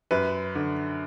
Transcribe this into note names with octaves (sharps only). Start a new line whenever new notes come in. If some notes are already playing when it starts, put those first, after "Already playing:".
F#2 B4
D3